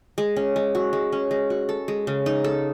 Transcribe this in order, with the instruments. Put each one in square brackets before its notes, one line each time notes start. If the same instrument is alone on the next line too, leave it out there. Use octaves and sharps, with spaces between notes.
[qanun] G#3
C#4
G#3
F#4
G#3
C#4
G#3
F#4
A4
G#3
C#3
D#4
A4